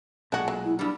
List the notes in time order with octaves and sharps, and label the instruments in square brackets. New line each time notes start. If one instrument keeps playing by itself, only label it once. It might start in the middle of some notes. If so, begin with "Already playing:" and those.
[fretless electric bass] B1 A#2 [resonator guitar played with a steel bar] G#3 [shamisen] D4 F#4
[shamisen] F#3
[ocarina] E4
[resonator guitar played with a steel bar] G2 G3 [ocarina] D4